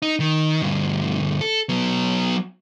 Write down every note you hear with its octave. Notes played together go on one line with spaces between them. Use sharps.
D#4
D#3
D2 G2
A4
F#3 B3